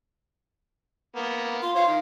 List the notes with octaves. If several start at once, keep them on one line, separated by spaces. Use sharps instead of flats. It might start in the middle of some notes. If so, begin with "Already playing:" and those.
A#3 B3
F4 C6
F4 C5 C#5 F5
D#3